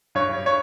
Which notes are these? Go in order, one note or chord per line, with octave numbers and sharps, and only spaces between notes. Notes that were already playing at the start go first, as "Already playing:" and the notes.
G2 C#5
C#5